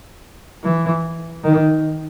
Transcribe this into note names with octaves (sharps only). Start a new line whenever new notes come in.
E3
D#3